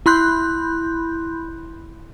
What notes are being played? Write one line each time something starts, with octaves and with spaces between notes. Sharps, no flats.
E4 B5 C6 F#6 G6